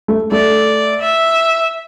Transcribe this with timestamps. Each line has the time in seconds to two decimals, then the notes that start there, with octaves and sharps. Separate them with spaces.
0.08 A3
0.31 A3 D5
1.01 E5